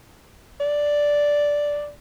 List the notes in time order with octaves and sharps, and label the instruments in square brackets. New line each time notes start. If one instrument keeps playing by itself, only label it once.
[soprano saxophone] D5